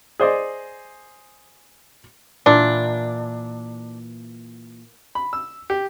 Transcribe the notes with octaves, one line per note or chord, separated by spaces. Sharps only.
G#4 C5 D5 D#5
A#2 E3 D4
B5
E6
G4